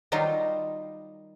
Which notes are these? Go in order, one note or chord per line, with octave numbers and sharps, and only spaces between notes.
D#3 F#3 G3 D#4 F4